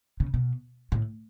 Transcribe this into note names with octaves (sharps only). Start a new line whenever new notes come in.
C#3
B2
A2